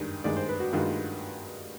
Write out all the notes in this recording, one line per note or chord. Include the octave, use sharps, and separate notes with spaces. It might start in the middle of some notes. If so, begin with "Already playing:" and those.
Already playing: G2 D#3 G#3
G2 D#3 G#3 D5
C5
B4
F#4
G2 D#3 G#3 F4